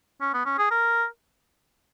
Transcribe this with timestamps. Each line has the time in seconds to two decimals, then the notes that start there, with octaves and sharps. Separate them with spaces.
0.21 C#4
0.34 B3
0.45 C#4
0.58 G#4
0.71 A#4